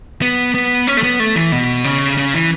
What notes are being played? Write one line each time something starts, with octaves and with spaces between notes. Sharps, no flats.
B3
B3
C#4
A3
B3
A3
E3
B2
C#3
C#3
E3